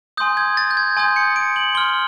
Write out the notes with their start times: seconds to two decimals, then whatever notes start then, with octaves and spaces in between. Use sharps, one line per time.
0.17 G#5 C6 D#6 G6
0.37 G#6
0.57 A6
0.71 G6
0.77 G#6
0.97 G#5 C6 D#6 G6 A6
1.16 C#7
1.36 D7
1.56 F#7
1.75 C6 F6 G7